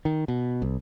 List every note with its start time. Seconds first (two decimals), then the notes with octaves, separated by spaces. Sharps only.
0.05 D#3
0.28 B2
0.62 C2